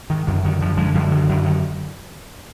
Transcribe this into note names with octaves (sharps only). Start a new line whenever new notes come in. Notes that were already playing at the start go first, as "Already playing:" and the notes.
G#2 D#3
F#2 D3
D3 D#3
F#2 D3 F3
D3 F3 G#3
F#2 D3 F3
D3 D#3
F#2 D3
D3 D#3